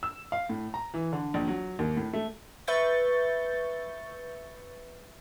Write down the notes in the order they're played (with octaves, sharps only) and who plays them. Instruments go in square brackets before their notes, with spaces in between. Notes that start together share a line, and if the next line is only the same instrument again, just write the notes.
[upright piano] E6
F5
A2
A#5
E3
D3
A#1
F#3
D#2
A2
A3
[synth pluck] B4 E5 C#6 G6 A6